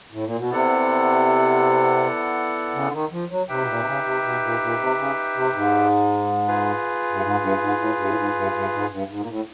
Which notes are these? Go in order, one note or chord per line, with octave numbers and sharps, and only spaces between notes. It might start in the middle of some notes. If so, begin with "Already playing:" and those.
A2
A#2
B2
C3 B3 E4 A4 D5 F#5
C#3
D3
D#3
F3
F#3
C3 D#4 G4 B4 E5 G5
B2
A#2
C3
C#3
C3
B2
A#2
A#2
C3
C#3
C3
G#2
F4 G#4 B4
G2
G#2
G2
G#2
A2
G2
A2
G#2
G2
G2
G#2
G2
G#2
A#2
A2